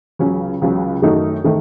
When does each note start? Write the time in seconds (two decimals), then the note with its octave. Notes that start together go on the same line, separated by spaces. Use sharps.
0.19 C#2 C#3 F#3 C#4
0.62 C#2 C#3 F#3 C#4
1.02 F#2 D#3 A3 D#4 F#4
1.44 D#3 A3